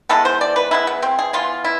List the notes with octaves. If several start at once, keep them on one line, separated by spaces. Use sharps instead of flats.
E3 G#3 B3 A4
C5
D5
B4
E3 G#3 B3 E4
B3
C4
G#4
E3 B3 F4
E4